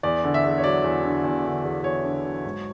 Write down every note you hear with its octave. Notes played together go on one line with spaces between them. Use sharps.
E2 D5
D3
E5
E2
C#5
F#3 D5
E2
D3
E2
D3
E2
E2 C#5
D3
F#3
G#2